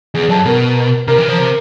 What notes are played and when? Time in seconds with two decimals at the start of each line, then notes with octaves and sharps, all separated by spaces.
0.14 E2 G#4
0.29 F#2 A4
0.45 B2 A#4
1.08 C3 A#4
1.18 E3
1.29 F3
1.38 C3